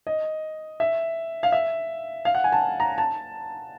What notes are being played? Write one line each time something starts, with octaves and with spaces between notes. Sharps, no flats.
D#5
E5
F5
E5
F5
F#5
G#5
A5
A#5
A5